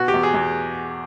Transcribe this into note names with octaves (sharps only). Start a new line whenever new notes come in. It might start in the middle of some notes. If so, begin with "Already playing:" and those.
Already playing: B2 F#4
G4
E2
G#4
E2